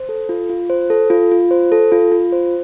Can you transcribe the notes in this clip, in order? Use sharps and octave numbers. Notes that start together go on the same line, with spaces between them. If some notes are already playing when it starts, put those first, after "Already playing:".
Already playing: C5
A4
F4
F4
C5
A4
F4
F4
C5
A4
F4
F4
C5